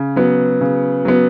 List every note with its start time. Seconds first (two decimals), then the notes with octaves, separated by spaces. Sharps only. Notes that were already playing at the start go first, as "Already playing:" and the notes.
Already playing: C#3
0.16 F#3 B3
0.61 C#3
1.05 F#3 B3